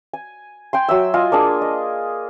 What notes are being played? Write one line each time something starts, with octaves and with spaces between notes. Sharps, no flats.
G#5
G5 G#5 C6
F#3 E5 E6
F4 D#5 G#5
A#3 D4 G#4
D#5